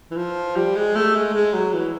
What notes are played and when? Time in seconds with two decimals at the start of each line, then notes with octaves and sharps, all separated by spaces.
0.11 E3
0.17 F3
0.56 G3
0.76 G#3
0.95 A3
1.15 G#3
1.33 G#3
1.53 F#3
1.73 E3